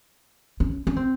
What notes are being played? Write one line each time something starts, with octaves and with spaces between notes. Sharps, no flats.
C#4
C#4
C4